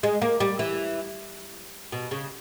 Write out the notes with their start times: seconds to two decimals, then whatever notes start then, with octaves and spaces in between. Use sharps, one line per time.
0.03 G#3
0.22 A#3
0.40 G3
0.59 E3
1.92 B2
2.11 C#3